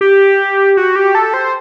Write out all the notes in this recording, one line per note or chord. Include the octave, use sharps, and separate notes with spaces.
G4
F#4
G4
A4
C5